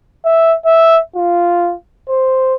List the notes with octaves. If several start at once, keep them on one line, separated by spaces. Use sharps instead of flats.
E5
E5
F4
C5